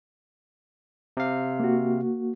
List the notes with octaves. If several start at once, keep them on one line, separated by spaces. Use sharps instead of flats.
C3 F5
A#3 F#4